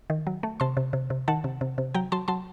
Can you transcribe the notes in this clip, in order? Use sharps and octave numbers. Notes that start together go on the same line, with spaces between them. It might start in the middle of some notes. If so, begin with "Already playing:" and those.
D#3
F#3
A3
C3 A5 C6
C3
C3
C3
D#3 F#5 A5
C3
C3
C3
F#3 G5 A#5
F#3 A5 C6
F#3 A5 C6